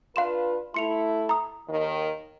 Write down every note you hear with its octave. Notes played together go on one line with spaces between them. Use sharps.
D4 F4 B4 F5 C6 E7
A3 E4 C6 C#7 F7
A#5 D#6
D#2 D#3